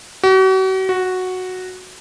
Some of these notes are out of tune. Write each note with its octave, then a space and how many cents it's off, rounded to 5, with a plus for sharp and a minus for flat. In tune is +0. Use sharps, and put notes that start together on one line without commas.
F#4 +40
F#4 -5